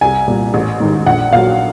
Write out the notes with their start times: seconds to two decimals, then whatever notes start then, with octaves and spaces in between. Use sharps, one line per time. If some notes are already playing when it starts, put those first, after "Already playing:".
0.01 C2 G#5
0.28 A#2 G3
0.54 A1
0.80 G#2 D#3 G#3
1.06 A#1 F#5
1.32 A#2 F#3 F5